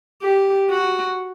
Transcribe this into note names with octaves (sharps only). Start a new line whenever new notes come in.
G4
F#4